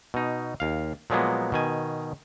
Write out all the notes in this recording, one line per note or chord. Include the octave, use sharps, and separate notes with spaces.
B2 D#4
D#2 F5
A#2 F3 F#3 G#3 A#3 B3
B2 D#3 G#5